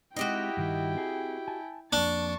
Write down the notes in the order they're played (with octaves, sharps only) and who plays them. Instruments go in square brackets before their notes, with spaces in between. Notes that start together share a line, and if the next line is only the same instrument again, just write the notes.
[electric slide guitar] G#3 C4 D#4 [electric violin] E4 G5 [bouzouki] F#4 G4 D#5
[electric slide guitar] G2 D#3 G3
C4 G#4
G#5 A5
[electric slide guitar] F2 A#3 [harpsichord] D4 [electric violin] A5 C#6